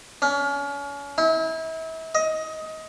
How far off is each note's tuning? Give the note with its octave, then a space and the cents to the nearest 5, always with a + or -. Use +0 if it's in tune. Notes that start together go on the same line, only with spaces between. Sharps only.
C#4 +35
E4 -35
D#5 +20